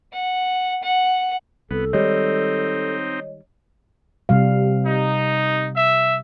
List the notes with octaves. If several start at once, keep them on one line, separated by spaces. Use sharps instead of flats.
F#5
F#5
C2 B3 A4
D#3 G3 G#3 C4 D#4 C#5 D#5
C3 G3 F5
D#4
E5